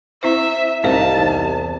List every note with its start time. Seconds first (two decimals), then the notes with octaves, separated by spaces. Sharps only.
0.23 C4 E4 C5 E5
0.84 C2 C4 D#4 C5 F5 A5
1.18 E2